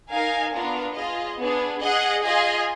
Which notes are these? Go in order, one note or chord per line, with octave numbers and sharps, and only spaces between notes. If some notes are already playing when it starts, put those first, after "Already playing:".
D#4 A#4 F5 G#5
B3 D4 F4 A#4
F4 G#4 D#5
B3 D4 G#4
G#4 D#5 F#5
F4 G#4 D#5 G#5